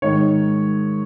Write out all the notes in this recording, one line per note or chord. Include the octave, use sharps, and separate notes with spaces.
G#2 D#3 C#5